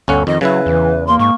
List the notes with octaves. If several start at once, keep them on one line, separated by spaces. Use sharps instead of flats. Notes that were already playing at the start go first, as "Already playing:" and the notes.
G1 D2 C#4 A4 F#5
F2 D#3 D#5
C#3 F#3 E4 B4
E2 E3
A#3 C6
G#2 C#6